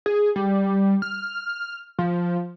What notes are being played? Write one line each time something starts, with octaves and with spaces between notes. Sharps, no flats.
G#4
G3
F6
F3